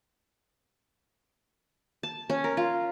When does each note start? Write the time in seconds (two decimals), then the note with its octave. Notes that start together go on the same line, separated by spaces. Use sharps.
2.03 A5
2.30 C#4
2.44 A#4
2.57 F4